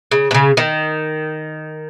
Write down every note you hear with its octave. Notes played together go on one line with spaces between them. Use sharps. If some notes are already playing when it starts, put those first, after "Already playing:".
C#3
B2
C#3
D#3